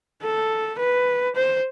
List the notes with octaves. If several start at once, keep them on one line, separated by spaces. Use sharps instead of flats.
A4
B4
C5